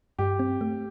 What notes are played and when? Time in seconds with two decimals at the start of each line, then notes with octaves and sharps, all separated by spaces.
0.19 G2 G4
0.39 C4
0.61 A3